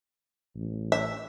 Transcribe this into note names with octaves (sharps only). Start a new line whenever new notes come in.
A1
E5